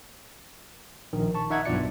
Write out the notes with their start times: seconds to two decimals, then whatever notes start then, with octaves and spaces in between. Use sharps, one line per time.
1.13 A#1 D#3
1.35 A5 C#6
1.50 D#4 E5 F#5 G#6
1.65 B1 G2 B3 F4 D5 C#7